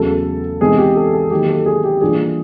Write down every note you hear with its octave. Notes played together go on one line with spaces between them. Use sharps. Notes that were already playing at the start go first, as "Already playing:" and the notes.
Already playing: E2 C#3 F#3 A3 A4
C3 E3 G#3 B3 D#4 G#4
G4
A4
A4
D#3 F#3 A#3 G4
A4
G#4
G4
E3 G3 A#3 D4 F4 G#4